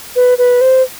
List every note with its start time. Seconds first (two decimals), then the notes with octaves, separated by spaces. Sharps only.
0.16 B4
0.38 B4
0.61 C5